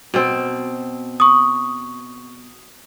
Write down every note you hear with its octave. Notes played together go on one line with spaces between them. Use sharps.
B2 C4
C#6 D#6